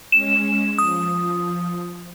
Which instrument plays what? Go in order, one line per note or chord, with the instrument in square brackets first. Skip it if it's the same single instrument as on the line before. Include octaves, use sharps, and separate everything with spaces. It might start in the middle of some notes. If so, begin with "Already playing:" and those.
[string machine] G#3 C#4 [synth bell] E7
[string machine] F3 [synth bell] D#6